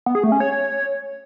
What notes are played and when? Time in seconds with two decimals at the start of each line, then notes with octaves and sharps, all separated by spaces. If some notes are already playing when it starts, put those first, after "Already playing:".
0.06 B3
0.15 G#4
0.23 A3
0.32 C#4
0.40 C#5